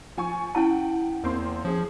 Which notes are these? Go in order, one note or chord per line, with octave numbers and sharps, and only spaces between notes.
F3 G#5 C#6
C#4 E4 F#5 G5 A5
E2 A#3 C4 C6
F3 C#4 G#4